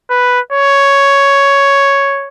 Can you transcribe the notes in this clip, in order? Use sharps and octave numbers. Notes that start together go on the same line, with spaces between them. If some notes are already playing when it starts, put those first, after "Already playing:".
B4
C#5